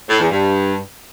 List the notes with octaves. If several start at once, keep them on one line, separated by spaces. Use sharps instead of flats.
A2
E2
G2